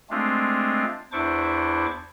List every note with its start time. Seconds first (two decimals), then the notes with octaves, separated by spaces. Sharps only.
0.10 G#3 A3 C4 D4 F4
1.12 E2 D4 E4 C5 C#6 D6